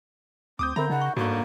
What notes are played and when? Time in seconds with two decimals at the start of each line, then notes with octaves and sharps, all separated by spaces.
0.59 D2 C4 D6 D#6 G6
0.76 D3 C4 A#4 E5 A#5 B5
0.90 C#3 D#4 D#5 F#5 B5
1.01 C#6
1.17 G1 G#2 D3 A#3 F#4 C#6